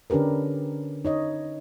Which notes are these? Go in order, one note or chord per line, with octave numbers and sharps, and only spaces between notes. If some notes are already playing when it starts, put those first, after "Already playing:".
D3 C#4 D4 G4 A#4 B4
D#4 C#5 D#5